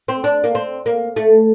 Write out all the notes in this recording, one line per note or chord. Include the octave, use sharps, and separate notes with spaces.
C4
D4
A#3
C4
A#3
A3